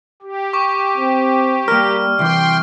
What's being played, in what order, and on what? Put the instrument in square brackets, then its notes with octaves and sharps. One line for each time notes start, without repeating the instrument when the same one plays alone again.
[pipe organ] G4
[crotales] C#6 D6
[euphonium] C4
[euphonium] G3 [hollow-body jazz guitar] A#3 A#4 [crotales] F6
[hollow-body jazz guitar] C2 E3 [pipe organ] G5 C6